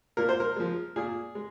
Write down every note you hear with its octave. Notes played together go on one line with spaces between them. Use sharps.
A#2 A#4
C5
A#4
F3 G#3
A#2 G#4
G#3